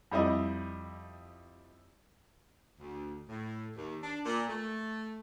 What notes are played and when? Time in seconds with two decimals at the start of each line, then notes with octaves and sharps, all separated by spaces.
0.11 F2 G3 E4 D#5
2.80 D2
3.29 A2
3.76 D#2
4.03 D4
4.26 A#2
4.48 A3